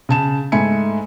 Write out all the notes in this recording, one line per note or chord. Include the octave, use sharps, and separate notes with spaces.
C#3 A5 E7
G#2 A3 E5 G#5 B5 C#7